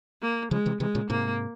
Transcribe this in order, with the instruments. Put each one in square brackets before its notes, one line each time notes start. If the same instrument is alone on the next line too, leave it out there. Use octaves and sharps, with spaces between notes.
[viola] A#3
[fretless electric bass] C#3 F3 [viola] G#3
[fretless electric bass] C3 E3
[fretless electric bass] C3 E3 [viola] G#3
[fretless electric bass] A#2 C#3
[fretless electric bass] G#2 C3 [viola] A#3